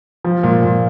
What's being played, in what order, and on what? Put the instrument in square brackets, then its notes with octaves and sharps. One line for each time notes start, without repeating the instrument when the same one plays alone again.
[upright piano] F3
A#2
A#2